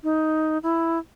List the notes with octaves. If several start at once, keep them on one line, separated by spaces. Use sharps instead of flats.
D#4
E4